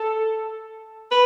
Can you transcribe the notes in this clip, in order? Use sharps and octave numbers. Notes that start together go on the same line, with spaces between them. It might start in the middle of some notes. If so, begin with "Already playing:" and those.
Already playing: A4
B4